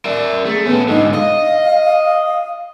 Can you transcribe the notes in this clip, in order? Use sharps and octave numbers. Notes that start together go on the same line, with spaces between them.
A#4 D5 E5
A3 G#4
B3 C#4 A4
G#2 D3 D#4
D#5 F5